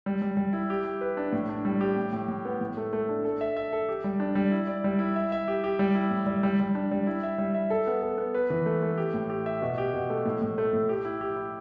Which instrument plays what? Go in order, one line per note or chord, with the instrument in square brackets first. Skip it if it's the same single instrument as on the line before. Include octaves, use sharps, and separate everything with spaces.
[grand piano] G3
G3
G3
E4
G4
G4
B4
D4
A2
D4
G3
G4
A2
A2
A2
B3
A2
A3
A3
D4
A4
E5
E5
A4
G4
G3
D4
G3
E4
D5
G3
E4
E5
E5
G4
G4
G3
E4
A2
G3
G3
G3
D4
G3
E4
E5
G3
E5
A4
B3
A4
B3
B4
E3
A3
A3
G4
A2
G4
E5
B2
G4
B2
A3
A2
A2
A3
A2
G4
E4
G4
E4